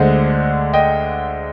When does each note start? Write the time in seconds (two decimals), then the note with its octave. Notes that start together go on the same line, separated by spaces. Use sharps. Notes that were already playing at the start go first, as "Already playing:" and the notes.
Already playing: D2 D3 G#3 C5 D#5
0.73 D#5 G5